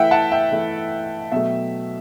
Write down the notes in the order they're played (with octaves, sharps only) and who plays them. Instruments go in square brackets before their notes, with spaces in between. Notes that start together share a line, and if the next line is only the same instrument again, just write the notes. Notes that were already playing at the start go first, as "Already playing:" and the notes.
Already playing: [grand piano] E3 A3 E4 E5 F#5 G5
F#5 A5
E5 G5
E3 A3 E4
B2 F#3 A3 E5